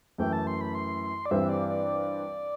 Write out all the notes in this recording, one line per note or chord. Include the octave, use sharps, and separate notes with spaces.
F#2 E3 A3 E4 G5
A5
C6
B5
C6
C6
D5
G2 E3 G3 C4 E5
D5
D5